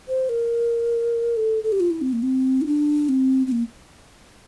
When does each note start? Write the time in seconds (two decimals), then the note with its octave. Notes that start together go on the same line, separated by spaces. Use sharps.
0.08 C5
0.29 A#4
1.37 A4
1.63 A4
1.72 G4
1.80 F4
1.90 E4
2.01 C4
2.13 A#3
2.23 C4
2.61 E4
2.66 D4
3.09 C4
3.47 C4
3.52 A#3